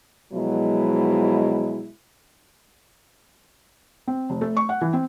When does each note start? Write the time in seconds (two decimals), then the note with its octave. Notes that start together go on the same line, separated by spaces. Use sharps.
0.32 B2 F3 F#3 G#3 E4
4.08 C4
4.30 F1
4.41 A3
4.57 C#6
4.69 F#5
4.81 E3
4.93 C4